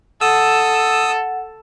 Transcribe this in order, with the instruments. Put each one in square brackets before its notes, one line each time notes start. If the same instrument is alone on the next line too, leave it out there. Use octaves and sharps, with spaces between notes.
[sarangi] A4 [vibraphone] F#5 [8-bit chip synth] D#6 E6